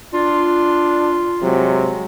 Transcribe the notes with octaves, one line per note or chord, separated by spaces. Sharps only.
D4 F4
C3 F#3 G#3